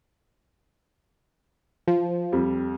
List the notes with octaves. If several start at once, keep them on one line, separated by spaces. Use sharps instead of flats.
F3
F2 G3